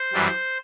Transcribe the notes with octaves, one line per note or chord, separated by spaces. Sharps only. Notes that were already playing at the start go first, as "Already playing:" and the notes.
Already playing: C5
F#2 E3 G3